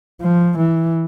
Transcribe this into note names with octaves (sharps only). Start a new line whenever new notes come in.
F3
E3